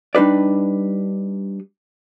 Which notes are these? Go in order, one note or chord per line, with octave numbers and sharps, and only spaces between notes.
G3 D4 D#4 B4 D5